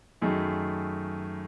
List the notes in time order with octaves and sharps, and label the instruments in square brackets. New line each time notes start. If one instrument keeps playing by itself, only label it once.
[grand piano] F#2 D#3 A3 D#4 G#4